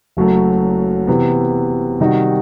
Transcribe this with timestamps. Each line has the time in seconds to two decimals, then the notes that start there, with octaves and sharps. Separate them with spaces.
0.17 F#1 F#2 F#3 A3
1.07 C3 E3 B3
2.00 C3 D#3 G3 D#4 F#4